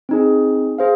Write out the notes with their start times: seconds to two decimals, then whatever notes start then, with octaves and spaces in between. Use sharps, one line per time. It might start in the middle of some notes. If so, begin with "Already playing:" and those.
0.09 C4 D#4 G#4
0.78 G#4 C5 F5